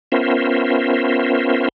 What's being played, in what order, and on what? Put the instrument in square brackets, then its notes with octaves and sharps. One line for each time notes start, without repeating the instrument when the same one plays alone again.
[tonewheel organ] B3 C#4 F4 A#4 C5 E5